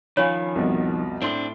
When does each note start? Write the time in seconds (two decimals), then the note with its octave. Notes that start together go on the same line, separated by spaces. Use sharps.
0.17 D#3 F3 C#4 C#5 F5 G#5 B5
0.55 C2 F2 B2
1.22 A2 C4 D4 C6 G7